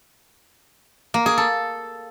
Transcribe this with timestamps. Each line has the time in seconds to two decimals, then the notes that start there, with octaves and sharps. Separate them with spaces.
1.14 A#3
1.26 G#4
1.38 A4